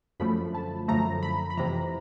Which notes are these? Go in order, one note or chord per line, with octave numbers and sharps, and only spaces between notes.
F#2 D3 F3 A3 B5
A5
F#2 D3 F3 A3 A#5
B5
B5
F2 C3 E3 A#5